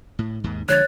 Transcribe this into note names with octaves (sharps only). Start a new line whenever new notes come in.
A2
D#2 G#2
D3 F3 G#3 C#5 F#6 A6